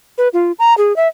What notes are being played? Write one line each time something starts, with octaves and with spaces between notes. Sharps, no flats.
B4
F4
A#5
G#4
E5